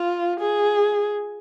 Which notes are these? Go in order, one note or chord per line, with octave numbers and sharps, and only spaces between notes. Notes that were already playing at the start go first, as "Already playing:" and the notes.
Already playing: F4
G#4